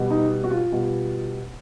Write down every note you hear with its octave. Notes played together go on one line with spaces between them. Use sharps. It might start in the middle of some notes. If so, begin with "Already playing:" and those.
Already playing: B2 G3
D#4
F#4
F4
B2 G3